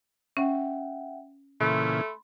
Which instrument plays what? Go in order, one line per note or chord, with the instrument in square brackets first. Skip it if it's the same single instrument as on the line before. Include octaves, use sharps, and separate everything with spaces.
[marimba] C#4 [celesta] E5 F#5 G5
[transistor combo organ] A#2 C#3 E3 [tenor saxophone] A3 [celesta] B5 C6